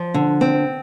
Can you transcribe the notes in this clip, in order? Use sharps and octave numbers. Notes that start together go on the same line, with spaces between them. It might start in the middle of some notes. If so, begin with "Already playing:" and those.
Already playing: F3
D3
C4